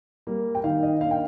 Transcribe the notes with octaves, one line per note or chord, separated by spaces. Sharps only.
G3 A#3
G5
D#3 F5
D#5
A#3 D4 F5
G5